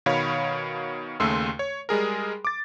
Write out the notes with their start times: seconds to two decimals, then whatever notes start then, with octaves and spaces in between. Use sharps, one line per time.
0.06 B2 D#3 C#5 F5 B5
1.20 D#2 C#3 A3 C6 E6
1.59 C#5
1.89 G3 G#3 G#4 A#4
2.45 D6 A6